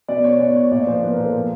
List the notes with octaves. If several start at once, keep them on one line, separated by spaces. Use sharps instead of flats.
B2 D5
C#5
B2 D5
C#5
A#2 D5
F3 C5
A#2 B4
A#4
F3
A4
A#2